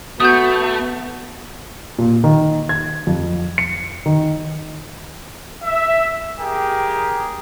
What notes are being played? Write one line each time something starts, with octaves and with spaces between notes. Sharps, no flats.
A3 B3 F#4 D#6 G6
A#2
D#3
G#6
F2
C#7
D#3
E5
G4 G#4 A#4